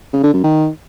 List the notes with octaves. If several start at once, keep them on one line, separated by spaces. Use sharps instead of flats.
C#3
D3
F#2
D#3